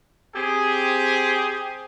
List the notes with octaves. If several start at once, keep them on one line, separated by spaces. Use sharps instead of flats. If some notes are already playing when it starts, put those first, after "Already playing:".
C4 G4 G#4